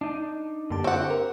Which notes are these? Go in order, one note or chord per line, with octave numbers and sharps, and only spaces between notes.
D4 D#4
F#2 D3 A#3 G4 A5
C4 F#5 C#6
A#4